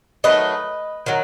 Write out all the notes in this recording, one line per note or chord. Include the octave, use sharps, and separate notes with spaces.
D#3 F#3 A3 B4 D#5
D#3 F#3